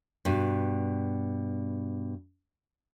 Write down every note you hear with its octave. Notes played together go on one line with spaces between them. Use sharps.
G2 B2